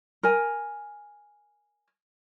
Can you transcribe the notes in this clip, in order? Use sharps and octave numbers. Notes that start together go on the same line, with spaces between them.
A#4 G#5